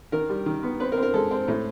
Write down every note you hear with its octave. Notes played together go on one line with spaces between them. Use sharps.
D#3 A#4
G3
D#3
B3
C4 B4
A#4
C4
A#4
G#3 A4
C4
A2